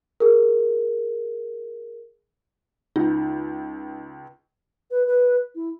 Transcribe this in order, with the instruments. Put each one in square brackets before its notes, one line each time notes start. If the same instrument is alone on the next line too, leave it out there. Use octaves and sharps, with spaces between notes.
[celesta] G#4 A#4
[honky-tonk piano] C#2 [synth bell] D#4
[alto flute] B4
B4
E4